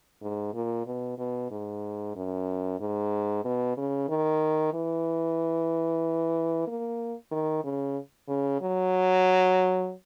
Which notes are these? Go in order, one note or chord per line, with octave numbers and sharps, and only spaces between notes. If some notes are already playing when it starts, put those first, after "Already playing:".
G#2
A#2
B2
B2
G#2
F#2
G#2
B2
C#3
D#3
E3
A#3
D#3
C#3
C#3
F#3